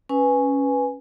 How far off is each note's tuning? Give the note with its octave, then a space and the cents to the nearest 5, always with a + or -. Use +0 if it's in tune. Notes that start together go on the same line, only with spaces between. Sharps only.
C#4 +0 B4 +0 G#5 +0